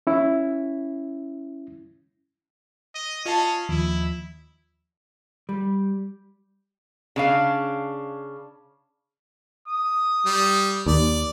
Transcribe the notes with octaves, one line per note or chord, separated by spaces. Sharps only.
C#4 E4
D#5
C#4 F4 D#5 A5 C7
D#2 F3 E4
G3
C#3 D4 F5
D#6
G3
D#2 D5